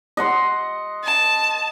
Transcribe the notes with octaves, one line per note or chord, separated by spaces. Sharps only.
D#5 F#5 C6
A5